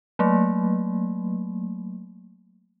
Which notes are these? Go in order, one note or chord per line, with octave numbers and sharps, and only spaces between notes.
F#3 A3 A#3